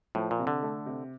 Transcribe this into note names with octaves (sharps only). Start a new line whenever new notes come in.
A2 F3
A#2
C3
D3
A3
C3